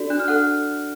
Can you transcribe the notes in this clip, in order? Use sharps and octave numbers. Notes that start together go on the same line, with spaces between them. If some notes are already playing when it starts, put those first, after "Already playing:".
Already playing: D4 F#4 A4 D5
D4 F#6
F6
A4 F#5 F#6